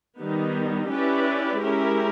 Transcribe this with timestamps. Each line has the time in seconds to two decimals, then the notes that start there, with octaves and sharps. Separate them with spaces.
0.20 D#3 G3 B3 D#4
0.91 C#4 E4 G4 B4 D5
1.62 G#3 C#4 E4 G4 A#4